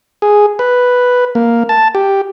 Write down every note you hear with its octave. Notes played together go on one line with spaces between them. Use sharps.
G#4
B4
A#3
A5
G4